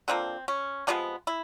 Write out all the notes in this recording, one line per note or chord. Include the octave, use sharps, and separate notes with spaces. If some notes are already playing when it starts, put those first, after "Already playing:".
D3 F3 A#3 C4
C#4
C3 F3 G#3 B3 D4
E4